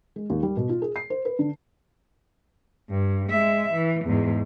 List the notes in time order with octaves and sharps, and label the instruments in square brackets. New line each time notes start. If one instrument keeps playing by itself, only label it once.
[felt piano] G#3
D#2
G3
B2
F4
G#4
C7
C5
B4
D3
[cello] G2
G#3 E5
E3
E2 G#2